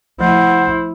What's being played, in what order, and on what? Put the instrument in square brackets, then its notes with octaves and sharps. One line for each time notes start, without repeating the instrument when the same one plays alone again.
[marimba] F3 A3 [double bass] E4 [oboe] C5 [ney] F#5